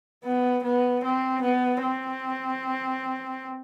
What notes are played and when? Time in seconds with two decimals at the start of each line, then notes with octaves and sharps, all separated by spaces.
0.24 B3
0.63 B3
1.04 C4
1.42 B3
1.82 C4